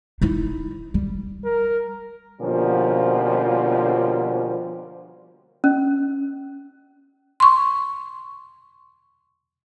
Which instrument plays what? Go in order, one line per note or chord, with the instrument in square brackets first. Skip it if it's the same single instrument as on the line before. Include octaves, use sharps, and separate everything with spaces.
[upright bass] D#4 E4
G3
[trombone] A#4
[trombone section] B2 D3 F3 G3 A#3 C#4
[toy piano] C#4
[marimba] C6 C#6